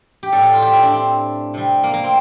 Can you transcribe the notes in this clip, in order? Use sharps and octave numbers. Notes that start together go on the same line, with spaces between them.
G4
A2 G3 A4
A4
F4
G4
E4
D4
C4
C3 G3
A#3
A#3
C4